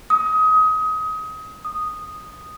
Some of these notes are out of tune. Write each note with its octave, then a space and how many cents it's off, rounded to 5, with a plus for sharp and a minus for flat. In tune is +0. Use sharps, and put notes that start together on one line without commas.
D#6 +25
D#6 -5